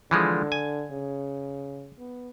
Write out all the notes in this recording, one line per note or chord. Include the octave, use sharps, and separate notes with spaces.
D3 E3 F3 G#3
G#5
C#3
B3